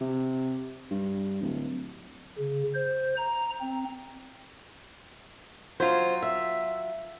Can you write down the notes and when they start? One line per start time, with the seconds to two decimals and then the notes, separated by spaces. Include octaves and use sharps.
0.01 C3
0.91 G2
1.42 D1
2.39 C#3
2.75 C5
3.17 A#5
3.61 C4
5.80 F#3 F4 C5
6.22 E5